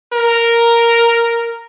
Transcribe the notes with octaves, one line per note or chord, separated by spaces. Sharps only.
A#4